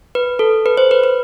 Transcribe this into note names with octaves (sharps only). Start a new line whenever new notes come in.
B4
A4
B4
C5
B4
B4